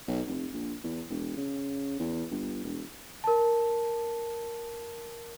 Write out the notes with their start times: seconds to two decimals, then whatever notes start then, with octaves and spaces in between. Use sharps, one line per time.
0.08 B1
0.27 F1
0.53 A#1
0.84 E2
1.10 E1
1.37 C#3
2.00 E2
2.31 G1
2.64 E1
3.24 A#4 A5